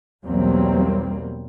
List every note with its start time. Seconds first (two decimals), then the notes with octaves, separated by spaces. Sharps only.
0.24 B1 E2 F#3 G3 A#3 C4